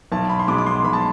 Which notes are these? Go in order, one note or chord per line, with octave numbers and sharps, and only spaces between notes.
B1 A5
B5
C6
B2 G#3 D6
D6
C6
B1 B5
A5